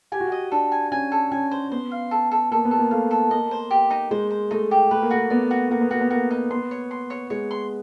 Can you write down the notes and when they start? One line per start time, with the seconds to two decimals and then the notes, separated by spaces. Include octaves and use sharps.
0.12 G4 G#5
0.20 F#4
0.28 G4
0.32 D#5
0.52 D4 A4
0.72 G#5
0.92 C#4 G#5
1.12 A4
1.31 C#4 G#5
1.51 C5
1.72 B3 C5
1.91 F5
2.11 A4
2.31 A4
2.51 A#3 A4
2.65 B3
2.71 A4
2.78 A#3
2.91 A3 F5
3.11 A4
3.31 A#3 D#5
3.51 C5
3.71 G4
3.90 D#4
4.11 G#3 C5
4.31 C5
4.51 A3 D#4
4.71 G4
4.91 A3 B4
5.02 A#3
5.11 A3 F#4
5.30 B3 D5
5.51 F#4
5.71 A#3 F#4
5.81 B3
5.91 A#3 F#4
6.01 B3
6.10 A#3 F#4
6.31 D#4
6.51 B3 C6
6.71 C#5
6.91 C6
7.10 C#5
7.30 G#3 C#5
7.51 C6